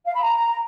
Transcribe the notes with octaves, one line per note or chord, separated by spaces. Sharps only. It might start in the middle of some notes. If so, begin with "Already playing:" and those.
F5
B5
A#5